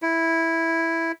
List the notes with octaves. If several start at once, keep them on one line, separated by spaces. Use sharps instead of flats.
E4